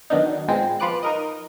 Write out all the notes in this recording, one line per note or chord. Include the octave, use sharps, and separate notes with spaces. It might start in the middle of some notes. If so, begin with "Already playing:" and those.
D#3 F#3 B3 D4 D#4
A#2 G#3 B3 C4
F3 F4 B4 D6 F#6
D#4 A#4 D#5